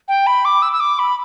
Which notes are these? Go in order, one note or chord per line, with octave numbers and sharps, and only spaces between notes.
G5
B5
D6
E6
E6
D6
B5